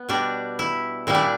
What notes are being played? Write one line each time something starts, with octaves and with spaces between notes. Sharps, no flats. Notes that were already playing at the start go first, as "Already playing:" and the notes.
Already playing: B3
B2 G3 D4
E4
A#2 G3 E4
D4